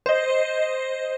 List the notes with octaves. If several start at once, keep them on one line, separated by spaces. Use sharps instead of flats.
C5 D#5